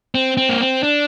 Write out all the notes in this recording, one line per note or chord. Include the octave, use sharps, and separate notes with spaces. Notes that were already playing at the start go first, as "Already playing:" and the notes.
C4
C4
A#3
C4
D4